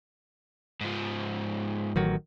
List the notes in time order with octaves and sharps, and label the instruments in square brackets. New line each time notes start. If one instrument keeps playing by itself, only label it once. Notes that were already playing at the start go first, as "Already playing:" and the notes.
[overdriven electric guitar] G#2 F3
[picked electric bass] A1 D#3 F#3